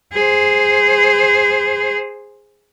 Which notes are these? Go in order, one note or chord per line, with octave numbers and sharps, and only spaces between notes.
G#4 C5